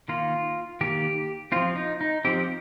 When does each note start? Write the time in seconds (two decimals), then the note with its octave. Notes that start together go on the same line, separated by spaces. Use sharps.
0.08 D#3 A#3 F4
0.81 D#3 A#3 G4
1.52 F3 C4 F4
1.76 D#4
2.01 D#4
2.25 F3 C4 G4